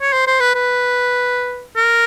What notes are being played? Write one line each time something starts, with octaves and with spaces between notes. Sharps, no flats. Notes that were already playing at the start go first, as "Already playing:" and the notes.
C#5
C5
C5
B4
B4
A#4